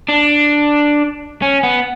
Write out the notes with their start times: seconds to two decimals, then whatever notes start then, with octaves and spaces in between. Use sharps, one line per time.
0.08 D4
1.42 C#4
1.63 B3